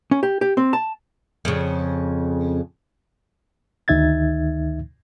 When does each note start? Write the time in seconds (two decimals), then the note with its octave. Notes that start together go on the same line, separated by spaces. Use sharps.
0.11 C#4
0.23 G4
0.41 G4
0.57 C4
0.73 A5
1.45 F2 C#3
3.88 D2 D#3 D#4 E5 G#6 A6